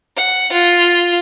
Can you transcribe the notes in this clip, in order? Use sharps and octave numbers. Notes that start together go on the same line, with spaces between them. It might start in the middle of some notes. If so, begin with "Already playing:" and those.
F#5
F4